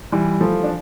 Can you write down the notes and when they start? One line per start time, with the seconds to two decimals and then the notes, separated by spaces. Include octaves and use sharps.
0.12 E3 G3
0.40 F3 A3
0.63 D4